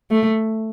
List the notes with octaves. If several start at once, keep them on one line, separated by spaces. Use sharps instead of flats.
A3